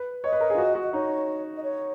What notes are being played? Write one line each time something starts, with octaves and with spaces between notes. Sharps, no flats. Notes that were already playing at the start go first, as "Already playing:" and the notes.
Already playing: B4
C#5 D#5
B4
A#4
G#4
F4
F#4
F#4
D#5
D#4 C#5
D#5
C#5